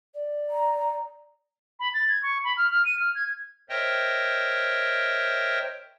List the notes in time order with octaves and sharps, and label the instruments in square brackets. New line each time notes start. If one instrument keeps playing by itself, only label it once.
[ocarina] D5
[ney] A#5
[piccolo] B5
A6
G#6
C#6
B5
F6
F6
D#7
F6
G#6
[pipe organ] A#4 C5 C#5 D#5 E5 G5